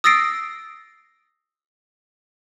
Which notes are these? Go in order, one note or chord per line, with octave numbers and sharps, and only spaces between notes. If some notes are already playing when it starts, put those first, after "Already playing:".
D#6 E6 A6 A#6 C7 D7